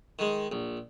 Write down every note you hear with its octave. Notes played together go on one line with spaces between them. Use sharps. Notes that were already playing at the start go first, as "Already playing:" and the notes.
D#3 G#3
A#1